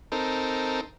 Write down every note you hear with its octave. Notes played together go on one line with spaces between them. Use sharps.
C4 D#4 A4 A#4